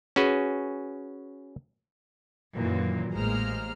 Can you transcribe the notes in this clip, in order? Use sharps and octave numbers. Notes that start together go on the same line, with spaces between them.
C#4 F#4 G#4 B4
F#2 A#2 D#3 E3 F#3
A1 G#3 A#3 C5 A#5 F6